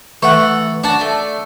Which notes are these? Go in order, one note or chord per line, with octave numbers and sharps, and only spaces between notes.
E3 A3 F#5 C#6
D4 F#4 A5
A3